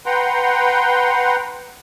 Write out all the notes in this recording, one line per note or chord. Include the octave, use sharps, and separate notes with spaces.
B4 F#5 G5 A#5 C6